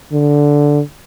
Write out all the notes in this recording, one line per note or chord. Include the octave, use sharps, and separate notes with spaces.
D3